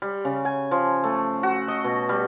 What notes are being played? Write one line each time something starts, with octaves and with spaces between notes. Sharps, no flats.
G3
C#3
G#5
F3
A3
F#4
D#5
B2
G3